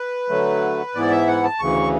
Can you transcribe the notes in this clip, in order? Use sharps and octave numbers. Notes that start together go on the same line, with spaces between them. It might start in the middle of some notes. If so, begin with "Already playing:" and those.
Already playing: B4
D3 F#3 A3
G#2 E3 B3 E4 D5
E5
F#5
A5
D2 C#3 E3 C#6